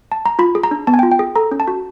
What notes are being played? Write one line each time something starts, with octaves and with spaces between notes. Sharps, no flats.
A5
A#5
F4 B5
G#4
A#5
D4
B3 A5
G#5
G5
F4
G5
G#4
A4 A#5
C#4
A5
F#4